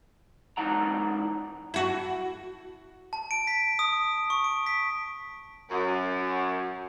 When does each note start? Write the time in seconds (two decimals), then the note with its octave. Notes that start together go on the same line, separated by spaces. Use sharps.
0.57 G#2 E3 D#4 F#5 A#5
1.74 E4 F#4
3.13 A5
3.31 D7
3.47 B6
3.79 D#6
4.30 C#6
4.44 D7
4.66 B6
5.70 F#2